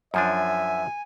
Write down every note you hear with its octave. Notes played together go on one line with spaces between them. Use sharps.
F#2 F3 D4 E5 G#5